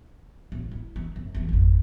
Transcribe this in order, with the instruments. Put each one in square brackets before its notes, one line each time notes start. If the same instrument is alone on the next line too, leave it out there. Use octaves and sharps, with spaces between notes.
[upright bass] A1 F4
E4
E3
F#2
E3 F3
G#1 F2